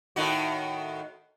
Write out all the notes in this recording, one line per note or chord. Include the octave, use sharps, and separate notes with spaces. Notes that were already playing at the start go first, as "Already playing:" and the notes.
A2 D#3 F#4